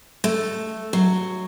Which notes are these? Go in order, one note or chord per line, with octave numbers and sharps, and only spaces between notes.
A3
F#3